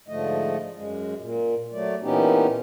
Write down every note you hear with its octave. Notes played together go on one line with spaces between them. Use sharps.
G#2 D3 F3 A3 D#5
F#2 G#3
A#2
F#3 A3 D5
A#2 E3 B3 C#4 D#4 G4